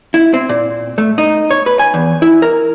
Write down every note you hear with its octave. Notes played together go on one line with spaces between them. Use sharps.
E4
C4
A#2
A3
D#4
C#5
B4
G#5
E2
E4
A#4